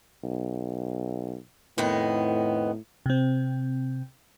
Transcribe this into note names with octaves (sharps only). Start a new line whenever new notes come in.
B1
F2 A2 D#3 B3
C3 C4